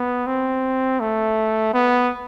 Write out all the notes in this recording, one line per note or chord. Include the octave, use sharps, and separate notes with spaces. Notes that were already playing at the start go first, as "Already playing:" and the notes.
Already playing: B3
C4
A3
B3